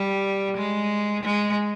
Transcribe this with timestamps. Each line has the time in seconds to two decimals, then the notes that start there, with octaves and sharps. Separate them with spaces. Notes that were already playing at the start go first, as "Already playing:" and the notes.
Already playing: G3
0.58 G#3
1.24 G#3